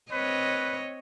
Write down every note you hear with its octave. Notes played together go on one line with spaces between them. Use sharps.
C4 B4 C#5 D#5